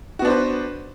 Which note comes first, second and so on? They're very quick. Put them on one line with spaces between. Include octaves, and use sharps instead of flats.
F#4 B3 D4 C5 B4